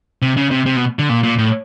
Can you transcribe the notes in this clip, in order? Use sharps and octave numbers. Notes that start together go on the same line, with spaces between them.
C3
C#3
C3
C3
B2
D3
A#2
A#2
A2